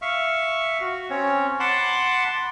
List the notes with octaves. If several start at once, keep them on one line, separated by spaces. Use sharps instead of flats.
E5 F5 C#6
F#4
C4 C#4 C#5
F#5 A5 B5 C6 D6